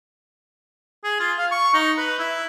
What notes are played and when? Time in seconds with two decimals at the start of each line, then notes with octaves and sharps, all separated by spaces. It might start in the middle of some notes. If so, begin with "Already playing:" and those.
1.04 G#4
1.20 F4
1.38 F5
1.51 C#6
1.74 D#4
1.98 B4
2.19 E4